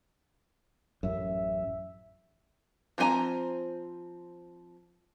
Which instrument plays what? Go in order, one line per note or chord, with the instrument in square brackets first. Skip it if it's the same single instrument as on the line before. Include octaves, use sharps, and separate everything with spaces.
[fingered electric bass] A1 F#2 [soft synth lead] E5
[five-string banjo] F3 C4 F#4 G#5 A#5